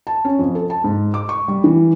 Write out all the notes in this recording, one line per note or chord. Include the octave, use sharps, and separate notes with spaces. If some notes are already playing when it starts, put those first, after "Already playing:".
A5
C#4
F2
A4
A5
G#2
D6
C#6
G3
E3